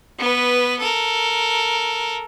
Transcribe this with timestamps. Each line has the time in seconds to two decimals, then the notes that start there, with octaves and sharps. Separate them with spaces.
0.19 B3 B4
0.80 A4 A#4